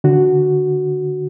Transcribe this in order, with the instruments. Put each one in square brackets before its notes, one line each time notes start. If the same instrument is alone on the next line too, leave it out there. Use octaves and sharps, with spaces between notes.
[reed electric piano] D3 F#4